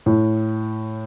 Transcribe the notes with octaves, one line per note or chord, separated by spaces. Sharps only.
A2